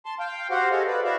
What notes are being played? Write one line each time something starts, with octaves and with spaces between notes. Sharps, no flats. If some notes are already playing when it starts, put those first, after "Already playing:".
A5 C6
F5 G5
F#4 G4 C5 F5 F#5
G#4 A4 D#5 F5
B4 D5
E4 F#4 D5 E5 F5